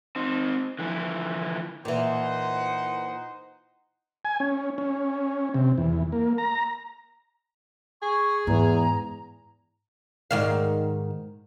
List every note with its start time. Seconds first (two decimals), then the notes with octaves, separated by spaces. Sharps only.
0.16 C4 D#4
0.79 D3 E3 F3 E4
1.85 A#2 E3 D#4 C5 F#5
4.25 G#5
4.40 C#4
4.78 C#4
5.54 C3
5.78 E2
6.12 A#3
6.38 A#5
8.03 G#4 C#6
8.47 E2 G#2 A#5
10.31 G#2 D#3 F5